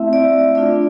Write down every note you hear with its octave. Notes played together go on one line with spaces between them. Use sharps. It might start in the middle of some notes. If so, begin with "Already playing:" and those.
Already playing: A3 C4 E4 E5
D5
A3 D4 F4 D5